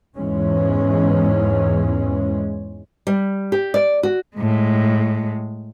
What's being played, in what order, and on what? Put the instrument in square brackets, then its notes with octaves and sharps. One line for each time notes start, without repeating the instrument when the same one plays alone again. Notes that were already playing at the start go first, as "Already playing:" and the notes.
[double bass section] E2 G#2 E3 G#3 C#4
[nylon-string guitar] G3
G4
D5
F#4
[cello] A2 G#3